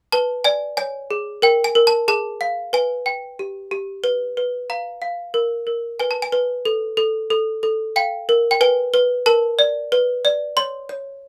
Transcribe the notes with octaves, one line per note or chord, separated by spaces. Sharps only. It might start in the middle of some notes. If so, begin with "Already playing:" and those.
B4 A5
D5 G#5
C#5 G#5
G#4
A#4 G5
G#5
A#4
A5
G#4 A5
F5
B4 G#5
G5
G4
G4
B4
B4
F5 A#5
F5
A#4
A#4
B4 G#5
A5
G#5
B4
A4
A4
A4
A4
F5 G5
A#4
G5
B4 G#5
B4
A#4 A5
D5
B4
D5
C#5 C6
C#5